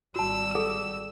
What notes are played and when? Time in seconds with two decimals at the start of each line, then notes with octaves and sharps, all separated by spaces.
0.16 G#1 G3 F#4 A5 E6
0.55 G#4 A4 F#5